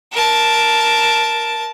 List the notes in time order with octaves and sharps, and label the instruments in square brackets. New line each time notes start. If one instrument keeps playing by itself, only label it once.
[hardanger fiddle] A#4 A5